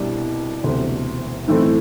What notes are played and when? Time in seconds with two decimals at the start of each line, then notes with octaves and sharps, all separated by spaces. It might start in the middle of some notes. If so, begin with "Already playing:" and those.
Already playing: C2 B2 G3 D4
0.64 E1 D2 C3
1.48 B1 A2 E3 A3 C4